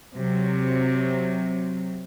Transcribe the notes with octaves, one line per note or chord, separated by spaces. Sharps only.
C3 F#3